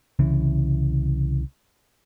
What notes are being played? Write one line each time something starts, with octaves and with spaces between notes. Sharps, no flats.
C2 C#3 E3